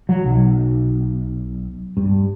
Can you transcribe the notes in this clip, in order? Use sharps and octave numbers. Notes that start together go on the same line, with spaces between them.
F#3
B1
G2